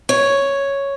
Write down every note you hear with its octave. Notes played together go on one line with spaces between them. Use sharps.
C#5